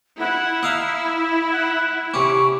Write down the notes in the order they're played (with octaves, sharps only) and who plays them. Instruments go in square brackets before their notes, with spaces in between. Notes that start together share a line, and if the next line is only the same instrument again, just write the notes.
[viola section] E4 [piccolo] F#5
[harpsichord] D#5 F5 A#5 [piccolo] E6
[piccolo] F#5
[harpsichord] C3 C#4 [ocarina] C#6 [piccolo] D6